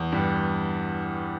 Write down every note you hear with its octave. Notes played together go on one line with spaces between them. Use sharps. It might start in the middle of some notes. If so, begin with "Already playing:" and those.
Already playing: E2
G2